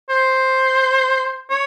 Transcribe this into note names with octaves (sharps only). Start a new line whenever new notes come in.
C5
C#5